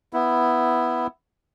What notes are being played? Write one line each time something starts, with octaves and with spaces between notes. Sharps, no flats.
B3 E4